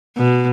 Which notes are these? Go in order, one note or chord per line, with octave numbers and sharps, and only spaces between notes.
B2